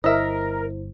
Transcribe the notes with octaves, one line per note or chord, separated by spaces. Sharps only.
G1 E4 A#4 C5 D#5 E5